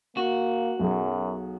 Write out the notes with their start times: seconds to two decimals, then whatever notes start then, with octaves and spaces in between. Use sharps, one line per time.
0.17 A#3 F#4
0.79 B1 F#2 F#3 G#4